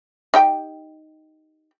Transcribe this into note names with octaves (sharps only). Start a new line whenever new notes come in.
D#4 G4 G5